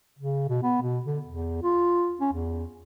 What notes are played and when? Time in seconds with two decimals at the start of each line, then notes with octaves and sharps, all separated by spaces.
0.19 C#3
0.49 B2
0.63 B3
0.82 B2
1.06 D3
1.27 E2
1.63 F4
2.21 C#4
2.33 E2